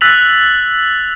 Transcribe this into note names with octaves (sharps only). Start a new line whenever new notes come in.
E6 F#6 A6 B6 F7 F#7